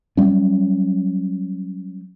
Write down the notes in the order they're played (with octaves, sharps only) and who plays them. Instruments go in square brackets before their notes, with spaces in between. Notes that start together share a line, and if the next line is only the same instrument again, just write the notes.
[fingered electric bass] F#3 G3 C#4